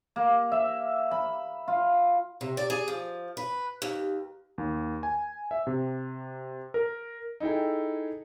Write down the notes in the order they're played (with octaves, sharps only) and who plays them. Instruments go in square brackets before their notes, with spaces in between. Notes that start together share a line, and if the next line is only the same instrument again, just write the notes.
[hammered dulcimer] A#3
E5
B5
F4
[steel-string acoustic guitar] C3
D5
G#4
F3
B4
D#2
[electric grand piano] D#2
G#5
E5
C3
A#4
[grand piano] D#4 E4 G#4 A4 G5